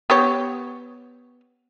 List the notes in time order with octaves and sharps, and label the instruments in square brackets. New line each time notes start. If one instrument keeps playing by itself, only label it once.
[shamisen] B3 G4 C#5